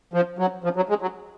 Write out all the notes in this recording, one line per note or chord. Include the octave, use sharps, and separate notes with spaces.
F3
F#3
F3
F#3
G#3
F#3